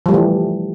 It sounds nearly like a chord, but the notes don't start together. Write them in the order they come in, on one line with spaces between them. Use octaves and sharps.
F3 G3 A3 E3